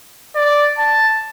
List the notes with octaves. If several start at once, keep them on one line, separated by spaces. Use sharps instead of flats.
D5
A5